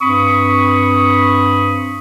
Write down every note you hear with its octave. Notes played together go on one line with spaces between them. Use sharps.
G2 C4 B5 C#6 D#6